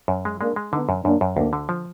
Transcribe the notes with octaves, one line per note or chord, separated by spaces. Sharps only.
F#2
G#3
G#3 A#3 D4
G#3
D3 B3 D#4
F#2
F#2 A#3 D4
F#2
D2 A#3 D4
D3
F3